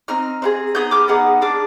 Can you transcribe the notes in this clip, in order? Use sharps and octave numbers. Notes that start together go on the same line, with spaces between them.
C4 D#4 F6
C4 D#4 G#4
B3 D#4 G#4 D#6 G6
D6 F6
B3 D#4 G#4 D#6
D4 G#4 D6 F6